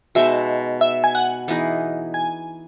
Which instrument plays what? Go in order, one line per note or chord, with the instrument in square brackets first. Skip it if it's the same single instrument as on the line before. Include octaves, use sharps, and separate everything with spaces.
[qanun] B2 G#3 D#4 [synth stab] E5
[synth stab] E5
G#5
F#5
[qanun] E3 B3 D#4 G#4
[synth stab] G#5